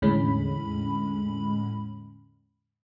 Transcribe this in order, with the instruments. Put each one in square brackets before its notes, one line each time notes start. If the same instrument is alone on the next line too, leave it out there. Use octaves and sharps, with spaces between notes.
[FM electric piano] E2 A2 D3 G#3 C#4 B5